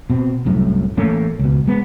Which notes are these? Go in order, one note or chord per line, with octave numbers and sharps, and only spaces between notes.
B2 C4
C2 F#2 A2
A1 A3 A#3 C#4
C#2 B2
G#3 B3